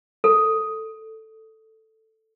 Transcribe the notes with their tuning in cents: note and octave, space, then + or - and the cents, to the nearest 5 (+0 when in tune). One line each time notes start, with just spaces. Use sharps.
A4 +5